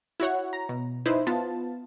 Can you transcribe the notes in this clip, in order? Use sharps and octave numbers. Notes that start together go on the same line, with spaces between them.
E4 F#4 C#5 F#5
A#5
B2
D#4 E4 B4 C5
B3 F4 A5